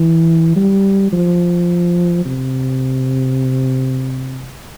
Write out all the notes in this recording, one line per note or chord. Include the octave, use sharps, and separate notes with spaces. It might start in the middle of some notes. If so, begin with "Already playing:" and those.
Already playing: E3
G3
F3
C3